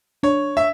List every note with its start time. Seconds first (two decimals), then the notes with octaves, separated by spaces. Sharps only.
0.23 D4 C#5
0.57 E5